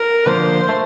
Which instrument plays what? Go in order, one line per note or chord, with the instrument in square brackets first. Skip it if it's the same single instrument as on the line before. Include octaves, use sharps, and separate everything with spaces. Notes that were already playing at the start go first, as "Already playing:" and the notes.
Already playing: [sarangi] A#4
[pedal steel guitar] D3 F3 A#3 [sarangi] C5
[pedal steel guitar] A3